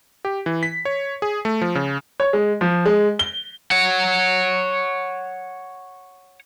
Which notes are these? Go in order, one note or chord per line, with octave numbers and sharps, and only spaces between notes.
G4
E3
B6
C#5
G#4
A3
F3
C#3
C#5
G#3
F3
G#3
G7
C#5 F#5